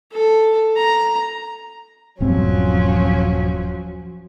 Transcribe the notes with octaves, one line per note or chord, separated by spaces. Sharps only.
A4
A#5
D#1 G2 F3 F#3 C4 C#4